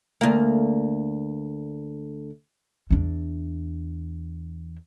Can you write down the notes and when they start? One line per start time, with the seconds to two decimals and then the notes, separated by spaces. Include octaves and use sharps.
0.21 D2 A#3
2.90 E2 D4